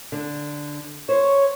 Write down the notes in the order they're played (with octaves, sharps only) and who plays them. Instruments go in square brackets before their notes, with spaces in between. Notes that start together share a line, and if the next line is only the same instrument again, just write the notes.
[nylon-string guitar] D3
[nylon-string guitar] C5 [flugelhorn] C#5